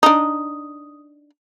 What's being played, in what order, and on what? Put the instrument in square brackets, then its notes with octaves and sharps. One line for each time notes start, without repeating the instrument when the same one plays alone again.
[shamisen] D4 D#4 [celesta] D#6